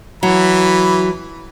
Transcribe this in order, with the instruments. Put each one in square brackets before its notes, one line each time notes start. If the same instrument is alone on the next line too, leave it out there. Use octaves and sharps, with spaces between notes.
[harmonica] E3 B5 [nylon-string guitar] F#3